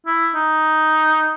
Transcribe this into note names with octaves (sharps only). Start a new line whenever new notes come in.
E4
D#4